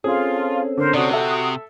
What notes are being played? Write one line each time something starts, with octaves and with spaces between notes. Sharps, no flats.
C4 C#4 F4 G#4 A4
D3 A#4 C5
C3 F#4 D5 D#6
A4 E5